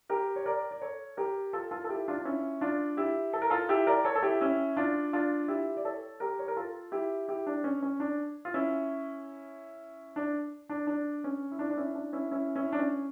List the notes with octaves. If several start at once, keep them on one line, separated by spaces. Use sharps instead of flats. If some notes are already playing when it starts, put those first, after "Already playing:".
G4 A#4
C#5
A#4 D5
D5
A4 C#5
G4 A#4
F4 A4
F4 A4
A4
E4 G4
D4 F4
D4
C#4 E4
D4 F4
E4 G4
A4
A#4
F4 A4
E4 G4
A#4 D5
A4 C#5
A4
E4 G4
C#4 E4
D4 F4
D4 F4
E4 G4
D5
A4 C#5
G4 A#4
C#5
A#4
F4 A4
E4 G4
E4 G4
D4
C#4
C#4
D4
F4
C#4 E4
D4
D4
D4
C#4
E4
D4
D4
C#4 E4
D4
C#4 E4
C#4 E4
C#4 E4
D4
C#4